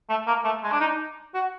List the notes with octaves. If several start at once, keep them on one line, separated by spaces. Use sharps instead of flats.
A3
A#3
A3
G#3
D4
D#4
F#4